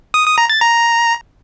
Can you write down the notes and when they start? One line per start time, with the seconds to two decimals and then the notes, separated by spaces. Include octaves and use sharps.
0.14 D#6
0.26 D#6
0.38 A#5
0.50 A6
0.61 A#5